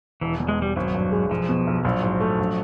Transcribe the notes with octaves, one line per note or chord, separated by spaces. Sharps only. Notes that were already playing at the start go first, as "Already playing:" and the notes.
E1 E3
E2
G#3
E1 G3
G#1 F#3
G2
G#3
B1 F3
B2
B1
A#1 F#3
G#2
A3
A#1